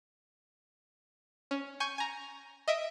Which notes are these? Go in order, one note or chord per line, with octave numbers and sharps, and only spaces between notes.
C#4
G#5 C#6 G6
G#5 A#5
D#5 E5 D7